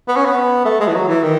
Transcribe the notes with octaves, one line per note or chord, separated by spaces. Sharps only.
B3
C#4
B3
A3
G#3
E3
F#3
E3
D#3